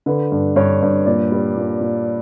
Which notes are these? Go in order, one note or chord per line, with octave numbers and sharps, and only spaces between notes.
D3 B4
G2
G2 C#5
G2
A#2 D5
G3
A#2
A#2